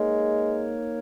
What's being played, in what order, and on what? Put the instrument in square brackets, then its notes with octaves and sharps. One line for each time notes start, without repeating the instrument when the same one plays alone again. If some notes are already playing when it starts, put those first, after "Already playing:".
Already playing: [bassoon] G#3 [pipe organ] A#3 D#4 A#4 C#5